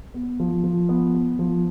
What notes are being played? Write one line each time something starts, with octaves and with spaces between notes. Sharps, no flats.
B3
F3
F3
B3
B3
F3